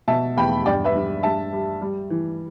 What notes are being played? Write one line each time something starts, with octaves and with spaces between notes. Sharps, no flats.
B2 E5 A5
E2 G5 B5
G2 D5 G5
B4 E5
G2
G2 E5 A5
G3
G3
E3